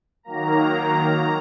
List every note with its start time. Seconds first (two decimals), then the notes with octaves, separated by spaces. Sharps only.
0.23 D#3 F#3 A#3 A#5
0.70 A#5